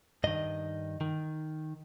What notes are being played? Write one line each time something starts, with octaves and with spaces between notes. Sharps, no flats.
G2 D#3 D#5
D#3